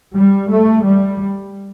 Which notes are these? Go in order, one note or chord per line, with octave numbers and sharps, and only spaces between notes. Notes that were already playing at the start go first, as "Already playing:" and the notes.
G3
A3
G3